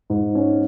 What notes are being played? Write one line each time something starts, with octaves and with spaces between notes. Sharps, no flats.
G#2
C#4